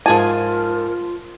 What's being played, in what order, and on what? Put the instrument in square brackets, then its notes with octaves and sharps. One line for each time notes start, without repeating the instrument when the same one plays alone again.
[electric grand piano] G#2 A5 [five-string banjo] F3 G#4 G#5 [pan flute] F4 [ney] A#4